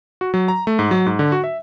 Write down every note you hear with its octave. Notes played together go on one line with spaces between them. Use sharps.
F#4
F#3
A#5
A3
G#2
F#3
G#2
D3
F#4
E5